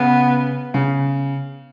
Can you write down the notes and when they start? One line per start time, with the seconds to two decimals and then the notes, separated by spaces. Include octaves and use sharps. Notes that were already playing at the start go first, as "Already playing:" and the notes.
Already playing: C#3 B3
0.74 C#3